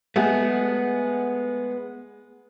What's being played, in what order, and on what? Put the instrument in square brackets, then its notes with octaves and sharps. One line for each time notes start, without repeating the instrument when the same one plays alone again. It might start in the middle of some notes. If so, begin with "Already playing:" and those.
[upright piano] G#3 F#5 G#5 [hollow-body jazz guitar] A3 B3